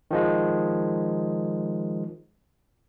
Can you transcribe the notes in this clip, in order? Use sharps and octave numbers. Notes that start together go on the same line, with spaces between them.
D#3 F3 G#3